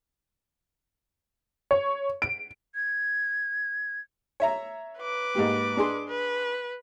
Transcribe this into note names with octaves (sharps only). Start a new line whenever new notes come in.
C#5
D7
G#6
C#5 E5 A#5
B4 D6
G#2 A#3 G4
D4 G#4 C6
B4